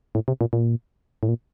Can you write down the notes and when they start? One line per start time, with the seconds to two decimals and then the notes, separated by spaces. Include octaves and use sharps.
0.15 A2
0.28 C3
0.41 A#2
0.53 A#2
1.23 A2
1.29 A#2